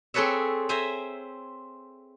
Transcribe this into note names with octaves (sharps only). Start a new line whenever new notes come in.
C4 G#4 A4 B4 C#5 E5
C5 E5 G#5 A#5